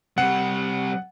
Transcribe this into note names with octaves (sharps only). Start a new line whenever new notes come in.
C3 G3 F#5